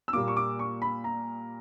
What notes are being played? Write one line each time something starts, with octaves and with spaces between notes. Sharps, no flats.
E6
A#2 G3 A#3 D6
C#6
D6
C#6
B5
A#5